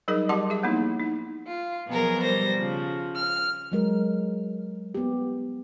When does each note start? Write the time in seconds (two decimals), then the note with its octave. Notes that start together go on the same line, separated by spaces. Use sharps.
0.08 F#3 G3 D#4 G#4 A#4 D#5
0.29 G3 G4 F#5 A5 C6 D6
0.50 G#4 E5
0.63 F3 A#3 B3 D#4 E4
0.99 D#4
1.48 F4
1.88 B2 F3 F#3 B3 G#4 A#4
2.23 G3 C5 A#6
2.56 C#3 F3
3.16 F6
3.72 F#3 G#3 A#4
4.95 B3 G4